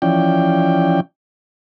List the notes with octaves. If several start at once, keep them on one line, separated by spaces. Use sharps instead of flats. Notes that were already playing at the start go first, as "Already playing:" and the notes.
E3 F3 C#4 D5 G5